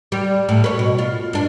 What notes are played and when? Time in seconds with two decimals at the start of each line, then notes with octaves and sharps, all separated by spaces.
0.12 G3
0.49 A2
0.64 B4 C#5
0.79 B2
0.99 F4
1.33 G2 D4